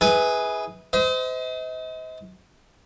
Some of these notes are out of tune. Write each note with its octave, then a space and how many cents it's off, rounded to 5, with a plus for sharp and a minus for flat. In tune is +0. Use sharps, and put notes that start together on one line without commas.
E4 -35 G#4 +0 B4 +0
C5 -35 D#5 +40